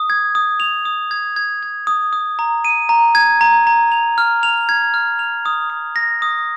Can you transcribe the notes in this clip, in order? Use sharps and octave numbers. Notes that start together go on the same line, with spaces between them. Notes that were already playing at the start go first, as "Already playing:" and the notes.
Already playing: D#6
G#6
D#6
F7
D#6
G#6
G#6
G#6
D#6
D#6
A#5
D#7
A#5
G#6
A#5
A#5
F7
F6
F7
G#6
F6
F7
D#6
D#6
A#6
D#6